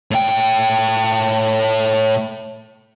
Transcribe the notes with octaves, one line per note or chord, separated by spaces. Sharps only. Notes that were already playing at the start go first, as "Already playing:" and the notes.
A2 G5